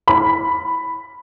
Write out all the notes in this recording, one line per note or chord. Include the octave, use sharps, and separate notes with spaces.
B5